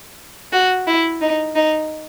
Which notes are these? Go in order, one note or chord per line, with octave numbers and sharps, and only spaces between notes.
F#4
E4
D#4
D#4